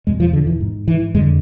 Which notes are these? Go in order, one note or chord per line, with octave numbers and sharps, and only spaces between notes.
E2 B2 G#3
F3
D3
E3
G#2
E3
F2 D3 G#3